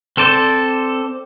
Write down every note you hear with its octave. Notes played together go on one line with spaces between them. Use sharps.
C4 A4 C5 D5